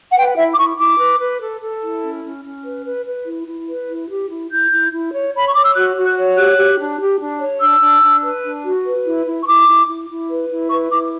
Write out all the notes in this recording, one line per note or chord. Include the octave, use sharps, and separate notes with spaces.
F#5
B4 G5
E4 E5
D6
E4 C#6
E4 D6
B4
B4
A4
A4
E4
C#4
C#4
C#4
B4
B4
B4
E4
E4
B4
E4
G4
E4
E4 G6
E4
E4
C#5
C#5 B5
C#6
C#5 D6
E6
F#4 F#6
F#4
F#6
C#5
G4 F#6
G4
D4
G4
D4
C#5
D4 E6
D4
D4
B4
D4
F#4
B4
E4
E4
C#6
E4 D6
E4
E4
E4
B4
E4
B4 C#6
E4 D6